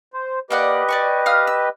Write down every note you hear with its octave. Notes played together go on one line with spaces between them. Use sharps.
C5
A#3 G4 B4 D5 D#5 F#5
D5 G#5 C#6
F5 D#6 F6
E6